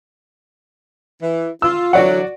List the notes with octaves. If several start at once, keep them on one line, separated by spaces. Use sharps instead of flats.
E3
F4 E6
D3 E3 F#3 F#4 D5 F#5